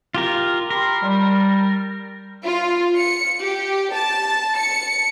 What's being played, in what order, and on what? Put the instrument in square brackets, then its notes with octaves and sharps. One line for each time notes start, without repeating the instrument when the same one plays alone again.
[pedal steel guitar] F4 G4 A#4
[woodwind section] G4 B5 C6 [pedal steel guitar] A#4
[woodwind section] G3
[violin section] F4
C#7
G4
A5
C#7